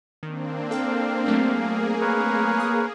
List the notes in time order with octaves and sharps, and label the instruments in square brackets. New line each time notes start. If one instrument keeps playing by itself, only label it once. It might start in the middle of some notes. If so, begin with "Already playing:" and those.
[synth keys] D#3 [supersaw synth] A#3 C4 D4
[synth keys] A4 G5 [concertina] F5
[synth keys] F#3 A3 C4 [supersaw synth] A#3 G#4
[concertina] A#4 B4 C#5
[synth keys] D#6